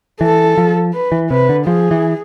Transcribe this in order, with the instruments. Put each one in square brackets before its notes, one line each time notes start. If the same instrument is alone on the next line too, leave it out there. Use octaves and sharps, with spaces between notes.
[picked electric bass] E3 [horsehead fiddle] A4
[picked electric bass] F3
[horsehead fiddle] B4
[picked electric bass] E3
[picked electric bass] C3 [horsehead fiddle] B4
[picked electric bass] D3
[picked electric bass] F3 [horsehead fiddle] G#4
[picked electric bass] E3